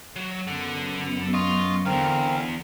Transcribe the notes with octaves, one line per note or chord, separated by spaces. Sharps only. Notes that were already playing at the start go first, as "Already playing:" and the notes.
F#3
F#2 B3 A4 F#5
F4 D#5 C6 C#6
E2 G2 D3 C4 A#4 F5